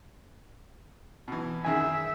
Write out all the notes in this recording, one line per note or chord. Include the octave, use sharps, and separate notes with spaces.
B2 E3
F#2 D#3 G#4 E5 G#5